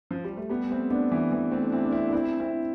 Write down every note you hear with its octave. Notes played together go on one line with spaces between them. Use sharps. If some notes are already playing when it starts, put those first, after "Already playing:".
F3
G3
A3
G3 B3
A3 C4
B3 D4
E3
E3
A3 C4
D4
C4 E4
D4
C4 E4
D4
C4 E4
C4 E4